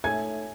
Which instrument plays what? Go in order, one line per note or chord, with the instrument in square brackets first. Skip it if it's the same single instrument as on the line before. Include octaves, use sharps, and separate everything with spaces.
[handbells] A3 D#4 A4 C#5 E5 [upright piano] G#5 G#6